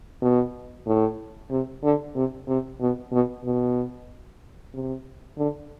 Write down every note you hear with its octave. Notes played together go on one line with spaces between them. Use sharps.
B2
A2
C3
D3
C3
C3
B2
B2
B2
C3
D3